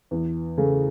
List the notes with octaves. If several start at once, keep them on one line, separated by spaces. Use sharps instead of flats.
E2
C#3 A3